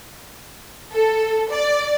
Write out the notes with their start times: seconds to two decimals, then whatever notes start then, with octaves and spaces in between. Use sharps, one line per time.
0.92 A4
1.50 D5